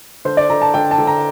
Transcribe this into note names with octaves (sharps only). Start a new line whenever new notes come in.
D3 C5
D5
D3 A#5
A5
D3 G5
A5
D3
A#5